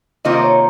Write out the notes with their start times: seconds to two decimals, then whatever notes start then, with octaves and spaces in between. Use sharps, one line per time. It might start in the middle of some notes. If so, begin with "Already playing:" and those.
0.25 C3 D#3 A#3 F4 C5 D#5
0.44 C#5